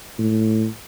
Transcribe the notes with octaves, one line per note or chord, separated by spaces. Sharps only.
A2